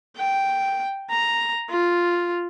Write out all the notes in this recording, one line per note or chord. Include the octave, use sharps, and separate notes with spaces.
G5
A#5
F4